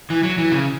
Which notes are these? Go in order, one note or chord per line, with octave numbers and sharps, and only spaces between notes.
E3
F#3
E3
C#3